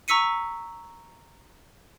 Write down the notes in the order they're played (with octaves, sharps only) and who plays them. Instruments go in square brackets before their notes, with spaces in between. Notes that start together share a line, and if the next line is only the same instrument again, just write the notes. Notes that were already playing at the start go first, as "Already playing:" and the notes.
[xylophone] A#5 C#6 E6 B6 C#7 D#7